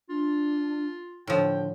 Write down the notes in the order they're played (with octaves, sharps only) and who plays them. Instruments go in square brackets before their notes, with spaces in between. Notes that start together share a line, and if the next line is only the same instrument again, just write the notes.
[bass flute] D4 [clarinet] F4
[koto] A2 F3 [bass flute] D3 [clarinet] G5